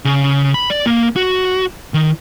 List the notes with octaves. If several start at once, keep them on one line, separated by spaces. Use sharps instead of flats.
C#3
B5
D5
A#3
F#4
D#3